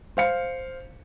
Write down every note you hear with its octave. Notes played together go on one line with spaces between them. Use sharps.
C5 F5 C#7